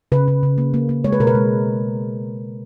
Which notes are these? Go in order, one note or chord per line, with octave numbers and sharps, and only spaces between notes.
C#3 B4
C#3
C#3
A#3
A#3
A#3
G#3 C#5
B4
B2 A#4
B4
G#3